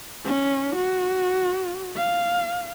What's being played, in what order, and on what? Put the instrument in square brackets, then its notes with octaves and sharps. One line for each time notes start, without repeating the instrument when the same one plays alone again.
[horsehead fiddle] C#4
F#4
F5